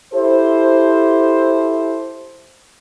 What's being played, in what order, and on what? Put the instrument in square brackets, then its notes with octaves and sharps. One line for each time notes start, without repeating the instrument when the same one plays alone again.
[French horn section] E4 G4 A4 C5